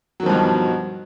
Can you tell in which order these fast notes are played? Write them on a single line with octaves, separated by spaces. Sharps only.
F#3 D#3 F3 G2 B2